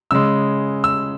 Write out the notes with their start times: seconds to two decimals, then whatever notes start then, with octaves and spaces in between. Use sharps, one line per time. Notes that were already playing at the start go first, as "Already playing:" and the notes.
0.11 C#3 G#3 E6
0.84 E6